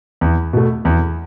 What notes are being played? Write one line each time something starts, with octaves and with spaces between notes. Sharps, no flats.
E2
B2 A3
E2